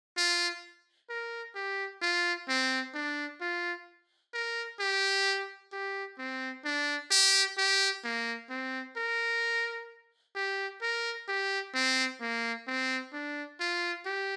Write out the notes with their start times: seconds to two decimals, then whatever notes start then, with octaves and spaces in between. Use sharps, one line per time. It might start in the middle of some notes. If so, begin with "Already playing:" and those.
0.17 F4
1.10 A#4
1.55 G4
2.02 F4
2.48 C4
2.94 D4
3.41 F4
4.33 A#4
4.80 G4
5.72 G4
6.19 C4
6.65 D4
7.11 G4
7.58 G4
8.04 A#3
8.50 C4
8.97 A#4
10.35 G4
10.82 A#4
11.28 G4
11.74 C4
12.21 A#3
12.67 C4
13.13 D4
13.60 F4
14.06 G4